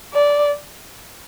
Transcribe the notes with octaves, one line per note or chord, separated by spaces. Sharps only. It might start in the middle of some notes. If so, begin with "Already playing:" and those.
D5